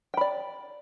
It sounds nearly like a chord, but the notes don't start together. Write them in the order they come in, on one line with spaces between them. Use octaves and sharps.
G5 B5 D5